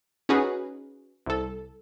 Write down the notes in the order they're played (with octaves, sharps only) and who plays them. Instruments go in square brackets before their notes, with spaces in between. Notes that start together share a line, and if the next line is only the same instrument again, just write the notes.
[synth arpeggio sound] C#4 D#4 F#4 G#4 B4
C2 A4